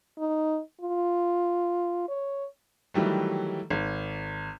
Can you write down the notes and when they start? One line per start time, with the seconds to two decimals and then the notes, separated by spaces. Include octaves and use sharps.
0.18 D#4
0.81 F4
2.08 C#5
2.94 D#3 E3 F#3 G3 A3
3.70 G#1